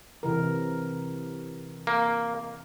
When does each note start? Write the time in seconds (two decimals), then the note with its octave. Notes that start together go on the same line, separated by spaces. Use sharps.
0.23 C3 E3 A#4
1.87 A#3